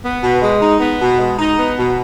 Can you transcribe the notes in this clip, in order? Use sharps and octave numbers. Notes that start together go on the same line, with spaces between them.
B3
B2
G#3
D#4
B3
B2
G#3
D#4
B3
B2